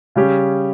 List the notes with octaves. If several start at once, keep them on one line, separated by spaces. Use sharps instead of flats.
C#3 G3 C#4 G4